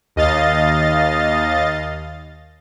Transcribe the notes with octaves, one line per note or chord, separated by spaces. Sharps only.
D#2 D#5 F5 A6